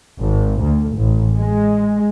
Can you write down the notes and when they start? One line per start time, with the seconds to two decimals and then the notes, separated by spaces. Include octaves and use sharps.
0.18 G#1
0.62 D2
0.97 A1
1.37 G#3